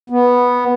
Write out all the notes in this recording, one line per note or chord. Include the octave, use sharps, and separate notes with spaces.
B3